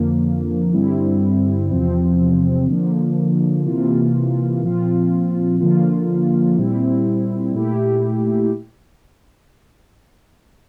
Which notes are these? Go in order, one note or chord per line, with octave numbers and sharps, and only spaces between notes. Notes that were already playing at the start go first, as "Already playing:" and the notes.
Already playing: F2 D3 F3 A#3
G2 D3 G3 C4 E4
E2 C3 F3 C4
D3 F3 A#3
C3 E3 A#3 F4
A#2 F3 C4 F4
D3 F3 A#3 F4
A#2 G3 C4 E4
A#2 A3 E4 G4